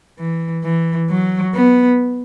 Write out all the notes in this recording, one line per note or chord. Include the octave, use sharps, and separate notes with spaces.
E3
E3
F#3
B3